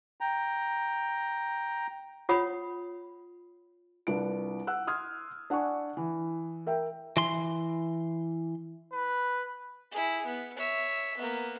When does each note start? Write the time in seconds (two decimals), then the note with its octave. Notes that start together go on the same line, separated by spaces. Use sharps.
0.21 G5 A#5
2.29 F4 C#5 F#5 B5 D#6
4.07 C2 D4 F4 B4 D7
4.67 F#5 E6 F#6
4.87 C6 D#6 F6 G#6
5.50 D4 F#5 G#5 C#6
5.97 E3
6.67 A#4 E5 G5
7.17 E3 C6
8.93 B4
9.91 E4 G#4
10.25 B3
10.56 C#5 E5
11.17 A#3 B3